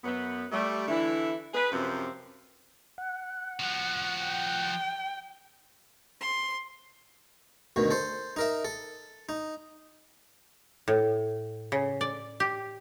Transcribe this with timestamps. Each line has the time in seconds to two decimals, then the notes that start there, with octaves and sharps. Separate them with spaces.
0.04 F#2 B3
0.52 G3 A3
0.88 D3 E3 E4
1.54 G#4 B4
1.72 F#2 C3 F3 C4
2.98 F#5
3.60 F3 F#4
4.25 G5
6.20 C6
7.76 D2 B2 D#3
7.91 A4 C5
8.36 D#4 A#4 E5
8.65 A4
9.29 D#4
10.88 A2
11.72 C#3
12.01 D5
12.40 G4